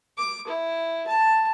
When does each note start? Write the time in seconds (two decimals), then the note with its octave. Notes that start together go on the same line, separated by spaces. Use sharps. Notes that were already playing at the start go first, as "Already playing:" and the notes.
0.17 D6
0.47 E4
1.07 A5